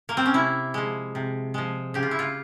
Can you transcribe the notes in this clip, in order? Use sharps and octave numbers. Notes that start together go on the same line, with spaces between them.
A#3
C4
C#4
C3 E4
F3 G#3
C3
F3 G#3
C#3 G4
F4
E4
F4